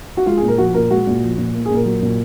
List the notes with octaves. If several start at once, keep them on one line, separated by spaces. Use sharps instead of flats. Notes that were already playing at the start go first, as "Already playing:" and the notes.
F#4
G#3 F4
G#4
A#2
A#4
F3 F#4
A#2 A#4
G#3 F#4
A#2
F3
A#2
A#3
G#4
A#2 A#4
F#3
A#2